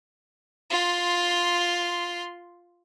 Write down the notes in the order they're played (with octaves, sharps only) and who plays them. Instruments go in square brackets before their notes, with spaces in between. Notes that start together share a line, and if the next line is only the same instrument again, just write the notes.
[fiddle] F4 C6